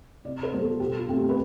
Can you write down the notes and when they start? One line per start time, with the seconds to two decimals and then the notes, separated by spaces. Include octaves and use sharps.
0.25 C3 D5
0.43 C5
0.52 G3 B3
0.61 A4
0.71 F4
0.80 B2 G4
0.99 F4
1.08 A3 C4
1.16 G4
1.29 B4